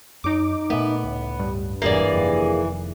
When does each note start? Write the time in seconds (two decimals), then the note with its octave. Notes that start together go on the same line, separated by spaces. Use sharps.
0.24 F#2 D#4 D6
0.70 A#2 A3 B3
1.04 C#2 A2
1.39 G2
1.82 E1 G#2 E3 G3 A#3 G#4 D5
2.13 F1 F2 D#3